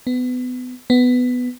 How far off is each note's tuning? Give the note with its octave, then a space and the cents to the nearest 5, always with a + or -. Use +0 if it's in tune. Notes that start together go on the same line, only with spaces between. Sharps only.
B3 +25
B3 +10